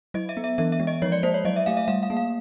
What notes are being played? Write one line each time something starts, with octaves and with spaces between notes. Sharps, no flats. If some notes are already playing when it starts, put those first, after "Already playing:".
F#3 D#5
E5
B3
E5
E3 E5
E5
G#3
D#5
F3 C#5
D5
A#3 C5
C#5
F#3 D#5
E5
A3 F5
E5
G3 F5
F5
A#3
F5